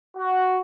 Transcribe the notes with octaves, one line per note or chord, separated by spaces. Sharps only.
F#4